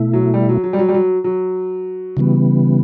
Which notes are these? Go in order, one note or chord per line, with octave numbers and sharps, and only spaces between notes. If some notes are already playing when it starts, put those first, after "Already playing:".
Already playing: B2 A3 E4
F#3
G3
F#3
F#3
G3
F#3
G3
F#3
F#3
C#3 E3 G3 B3